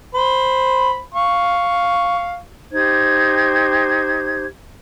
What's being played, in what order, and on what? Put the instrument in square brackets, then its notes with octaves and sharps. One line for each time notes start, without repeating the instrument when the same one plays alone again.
[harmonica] C5 B5
F5 C#6
[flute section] D#4 G4 C5 G#6